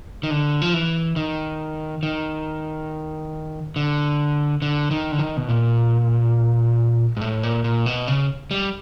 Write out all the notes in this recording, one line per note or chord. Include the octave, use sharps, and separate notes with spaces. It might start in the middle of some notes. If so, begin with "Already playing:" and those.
D#3
D3
F3
E3
D#3
D#3
D3
D3
D#3
D3
D#3
B2
A#2
G#2
A2
A#2
A#2
B2
C#3
G3